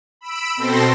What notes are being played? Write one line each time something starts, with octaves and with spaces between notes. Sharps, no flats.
B5 E6 D7
B2 C4 A4 C6 A#6